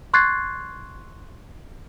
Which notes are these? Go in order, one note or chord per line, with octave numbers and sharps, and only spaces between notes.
C6 C#6 F#6 G#6 A6 C7